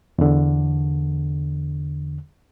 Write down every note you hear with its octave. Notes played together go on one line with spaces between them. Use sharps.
E2 D3